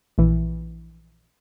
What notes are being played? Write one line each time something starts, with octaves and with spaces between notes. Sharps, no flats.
A#1 E3